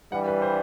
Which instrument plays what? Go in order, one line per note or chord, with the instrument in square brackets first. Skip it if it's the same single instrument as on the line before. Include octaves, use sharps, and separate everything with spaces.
[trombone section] G2 E3 G3 [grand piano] F#5
[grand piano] B4
C5